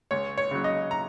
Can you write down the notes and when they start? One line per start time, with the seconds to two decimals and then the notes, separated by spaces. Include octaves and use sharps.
0.11 C#2 C#5
0.38 C#5
0.51 C#3 F#3
0.64 D#5
0.91 A#5